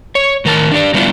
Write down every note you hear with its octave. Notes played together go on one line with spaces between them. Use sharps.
C#5
A2 D#3 A#4 D#5 A5
D4 G4 D5
F#3 G3 B3 D4 E4 F4